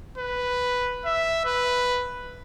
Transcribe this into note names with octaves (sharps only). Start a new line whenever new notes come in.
B4
E5
B4